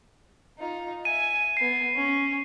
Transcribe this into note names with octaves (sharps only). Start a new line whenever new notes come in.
D#4 F4
E5 G#5 D#7
B3 G#5 C7
C#4